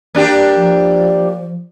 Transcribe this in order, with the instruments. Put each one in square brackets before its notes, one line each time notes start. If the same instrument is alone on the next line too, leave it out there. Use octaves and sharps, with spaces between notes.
[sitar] A#3 D4 G4
[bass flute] F3